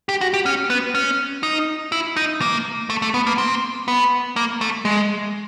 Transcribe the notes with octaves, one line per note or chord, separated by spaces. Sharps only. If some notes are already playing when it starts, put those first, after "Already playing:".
G4
F#4
G4
C#4
B3
C#4
D#4
E4
D#4
A#3
A3
A3
B3
A#3
C4
B3
A#3
A3
G#3